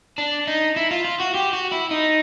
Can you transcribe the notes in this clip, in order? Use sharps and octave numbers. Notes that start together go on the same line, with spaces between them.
D4
D#4
E4
F4
F4
F#4
G4
F#4
E4
D#4